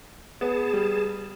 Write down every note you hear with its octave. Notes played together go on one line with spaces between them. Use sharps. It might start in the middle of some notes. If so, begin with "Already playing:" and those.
B3 G#4 A5
G3